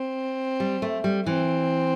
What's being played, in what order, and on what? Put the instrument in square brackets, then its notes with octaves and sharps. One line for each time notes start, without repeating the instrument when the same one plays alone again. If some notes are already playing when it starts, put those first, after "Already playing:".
Already playing: [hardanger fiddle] C4
[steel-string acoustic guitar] G3
A3
G3
[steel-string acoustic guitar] E3 [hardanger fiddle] C4